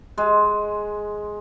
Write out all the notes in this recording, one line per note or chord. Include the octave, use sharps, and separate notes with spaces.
G#3